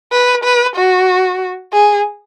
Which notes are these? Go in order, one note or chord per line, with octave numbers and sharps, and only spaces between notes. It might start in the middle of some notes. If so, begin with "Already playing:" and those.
B4
B4
F#4
G#4